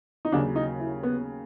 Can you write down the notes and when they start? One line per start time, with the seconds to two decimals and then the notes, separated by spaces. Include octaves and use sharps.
0.25 D#4
0.32 D#2 C#3 F#3 D4
0.56 D#4
0.80 E4
1.03 B3